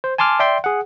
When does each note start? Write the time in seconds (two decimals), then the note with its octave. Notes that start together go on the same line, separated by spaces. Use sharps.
0.04 C5
0.18 G#5 A5 C6 D6 F6
0.40 D5 E5 G5 C6
0.64 G#4 F#5